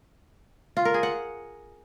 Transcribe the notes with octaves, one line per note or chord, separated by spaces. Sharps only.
F4
A#4
G#4
F#5